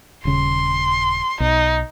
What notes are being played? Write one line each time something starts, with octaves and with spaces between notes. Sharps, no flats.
D#1 C#3 C6
B1 D#4